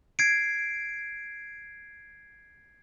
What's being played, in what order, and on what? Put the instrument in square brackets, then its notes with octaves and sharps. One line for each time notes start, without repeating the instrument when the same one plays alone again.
[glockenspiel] G#6 C7 D7